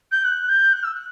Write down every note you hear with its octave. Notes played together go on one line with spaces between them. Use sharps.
G6
F#6
G6
F#6
E6
F#6